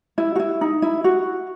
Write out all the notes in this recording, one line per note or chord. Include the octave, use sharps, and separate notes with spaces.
E4
F#4
E4
D#4
E4
F#4